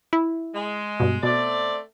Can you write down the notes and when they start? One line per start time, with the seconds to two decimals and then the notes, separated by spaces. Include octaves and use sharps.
0.13 E4
0.54 G#3
1.00 G2 B2
1.23 B2 A3 C4 D5